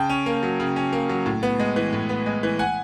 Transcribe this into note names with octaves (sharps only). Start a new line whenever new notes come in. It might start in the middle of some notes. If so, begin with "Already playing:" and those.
Already playing: C#3 G5 A5
C#4
A#3
F#3
C#3
C#4
A#3
F#3
A2
B3
G#3
E3
A2
B3
G#3
E3
F#5 G#5